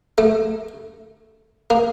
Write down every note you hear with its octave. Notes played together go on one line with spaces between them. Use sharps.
A3
A#3